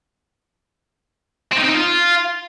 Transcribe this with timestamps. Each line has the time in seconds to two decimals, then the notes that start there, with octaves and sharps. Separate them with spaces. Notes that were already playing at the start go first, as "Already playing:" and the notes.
1.52 C4
1.58 D#4
1.63 C4
1.69 D#4
1.74 F4